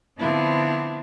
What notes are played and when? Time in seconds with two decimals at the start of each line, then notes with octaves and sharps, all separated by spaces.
0.18 D3 F3 B3 C4 D4 E4